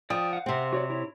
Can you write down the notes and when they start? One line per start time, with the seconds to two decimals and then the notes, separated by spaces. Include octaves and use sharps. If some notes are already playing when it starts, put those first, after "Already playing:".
0.10 F3 D5 G5 D#6
0.33 F5 F#5
0.46 C3 C4
0.73 F#4 C#5 D5
0.90 E4 C#5